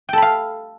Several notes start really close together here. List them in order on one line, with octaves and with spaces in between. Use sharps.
G5 A4 B5 F5